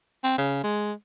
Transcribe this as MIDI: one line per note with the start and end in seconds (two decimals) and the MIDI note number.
0.24 0.37 60
0.38 0.60 49
0.64 0.92 56